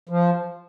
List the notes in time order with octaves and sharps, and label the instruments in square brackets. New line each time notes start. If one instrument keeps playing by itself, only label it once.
[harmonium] F3